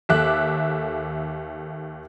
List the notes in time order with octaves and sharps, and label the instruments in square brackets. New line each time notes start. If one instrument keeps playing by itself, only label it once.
[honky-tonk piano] D#2 A4 E5 D6 F#6